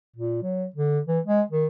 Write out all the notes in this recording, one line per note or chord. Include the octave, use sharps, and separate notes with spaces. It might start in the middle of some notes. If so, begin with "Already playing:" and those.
A#2
F#3
D3
E3
G#3
D#3